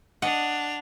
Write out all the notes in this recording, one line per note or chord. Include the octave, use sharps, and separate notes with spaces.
D4 D#5 F#5 F7